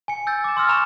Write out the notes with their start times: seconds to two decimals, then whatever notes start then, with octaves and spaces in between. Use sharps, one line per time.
0.08 G#5 C#7
0.27 E6 G6 A6
0.44 D6 E6 E7
0.57 C6 E6 F6 A#6
0.69 G#5 A#5 C#6 F6 E7 F7